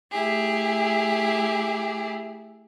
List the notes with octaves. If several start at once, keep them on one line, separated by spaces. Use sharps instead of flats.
A3 E4 G4 G#4